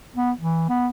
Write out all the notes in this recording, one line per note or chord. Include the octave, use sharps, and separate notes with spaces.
B3
E3
B3